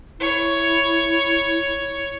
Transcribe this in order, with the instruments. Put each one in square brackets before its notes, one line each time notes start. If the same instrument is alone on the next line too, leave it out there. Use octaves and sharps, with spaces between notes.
[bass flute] E4 [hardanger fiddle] C#5